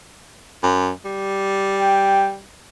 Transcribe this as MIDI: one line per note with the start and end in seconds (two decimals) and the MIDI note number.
0.63 0.90 42
1.05 2.47 55
1.76 2.33 79